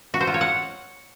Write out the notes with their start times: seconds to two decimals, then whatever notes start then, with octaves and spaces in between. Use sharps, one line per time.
0.14 F#4
0.21 C5
0.27 F4
0.34 C#5
0.41 F#5